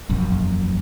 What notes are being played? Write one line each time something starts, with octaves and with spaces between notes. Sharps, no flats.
E1 A#1 F#2